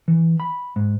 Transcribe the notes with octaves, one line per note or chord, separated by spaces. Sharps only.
E3
B5
G#2